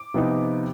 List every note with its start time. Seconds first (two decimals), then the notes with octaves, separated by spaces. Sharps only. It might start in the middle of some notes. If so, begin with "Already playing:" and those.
Already playing: D6
0.14 C3 F3 B3 D#4